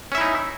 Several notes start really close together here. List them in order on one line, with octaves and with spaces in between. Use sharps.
C#4 E5 E4 D#4